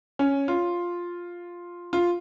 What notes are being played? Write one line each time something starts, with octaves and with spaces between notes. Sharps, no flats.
C#4
F4
F4